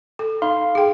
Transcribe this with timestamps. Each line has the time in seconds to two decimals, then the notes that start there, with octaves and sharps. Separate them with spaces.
0.19 A4
0.42 D#4 F5 C6
0.75 G#4 G5